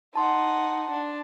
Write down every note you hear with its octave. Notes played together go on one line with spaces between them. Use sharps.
D#4 F#5 A5 C6
D4